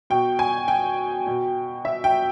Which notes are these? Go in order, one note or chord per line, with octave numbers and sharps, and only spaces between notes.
B2 G5
G#5
G5
B2
E5
G5